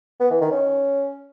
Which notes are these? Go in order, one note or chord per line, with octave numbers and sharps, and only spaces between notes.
B3
E3
D#3
C#4